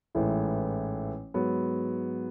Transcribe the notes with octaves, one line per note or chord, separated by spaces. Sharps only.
A1 G#2 E3 A3 E4
G#2 F#3 B3